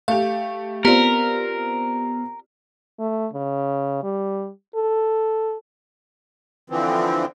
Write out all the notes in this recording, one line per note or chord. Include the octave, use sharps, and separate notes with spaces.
A3 G4 F5
B3 C4 F4 G4 A#4 D5 C#7
A3
C#3
G3
A4
D3 E3 F3 C4